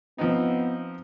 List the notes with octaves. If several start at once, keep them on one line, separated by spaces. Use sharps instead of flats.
F3 B3 C4 D#4